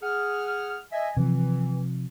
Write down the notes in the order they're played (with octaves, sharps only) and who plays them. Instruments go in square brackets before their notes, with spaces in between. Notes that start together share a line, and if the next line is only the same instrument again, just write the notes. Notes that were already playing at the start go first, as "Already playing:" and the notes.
[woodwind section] G#4 F#5 F6
D#5 E5 G#5
[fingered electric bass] C3 F3 [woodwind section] E3